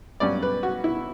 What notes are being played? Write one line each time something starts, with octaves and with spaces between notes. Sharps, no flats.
G2 F#3 C#4 D5
B4
F#4
E4